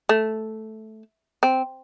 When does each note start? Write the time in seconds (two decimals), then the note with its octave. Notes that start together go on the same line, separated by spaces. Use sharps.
0.09 A3
1.43 C4